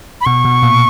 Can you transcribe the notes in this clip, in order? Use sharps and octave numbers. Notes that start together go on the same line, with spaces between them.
B5
B2 C#6
B2
A#2